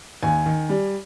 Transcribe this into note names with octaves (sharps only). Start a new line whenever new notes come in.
D#2 G#5
D#3
G3